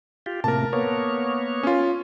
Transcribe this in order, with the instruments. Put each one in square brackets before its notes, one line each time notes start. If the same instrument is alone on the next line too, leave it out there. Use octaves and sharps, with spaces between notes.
[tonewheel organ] F4 G4
[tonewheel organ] A2 C3 A#3 [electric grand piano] A#4 A5
[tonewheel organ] A#3 B3 C#5
[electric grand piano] C#4 F4